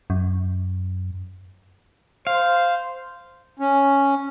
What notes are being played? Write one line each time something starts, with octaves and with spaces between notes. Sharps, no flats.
F#2
C5 F5
C#4